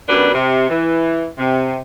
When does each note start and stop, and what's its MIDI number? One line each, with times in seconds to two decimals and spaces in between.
0.09 0.31 42
0.09 0.31 47
0.09 0.31 55
0.09 0.31 62
0.09 0.31 71
0.34 0.65 48
0.69 1.29 52
1.37 1.79 48